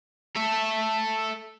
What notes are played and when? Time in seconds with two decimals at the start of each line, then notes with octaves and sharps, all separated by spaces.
0.36 A4 E5